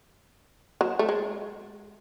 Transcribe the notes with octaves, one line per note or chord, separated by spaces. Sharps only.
F#3
A3
G#3